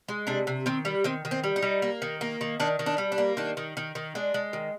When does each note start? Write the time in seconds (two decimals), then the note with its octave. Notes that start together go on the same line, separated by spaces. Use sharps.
0.08 G#3
0.27 C3 D4
0.47 C3
0.66 D#3 C4
0.85 G3
1.04 D#3 C4
1.25 D#3
1.31 C4
1.44 G3
1.56 D#4
1.62 G3
1.82 A#3
2.02 D#3
2.21 A#3
2.41 D#3
2.60 D#3 D4
2.79 D#3
2.86 D4
2.98 G3
3.12 D4
3.18 A#3
3.37 D#3 D4
3.57 D#3
3.77 D#3
3.95 D#3
4.15 G#3 D4
4.34 G#3
4.53 D#3